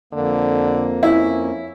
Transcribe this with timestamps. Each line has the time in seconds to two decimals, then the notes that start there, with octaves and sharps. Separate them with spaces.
0.13 F2 D3 A#3
1.03 C#4 E4